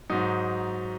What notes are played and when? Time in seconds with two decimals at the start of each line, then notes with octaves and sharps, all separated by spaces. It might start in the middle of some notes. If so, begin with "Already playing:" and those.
0.10 G#2 F#3 D#4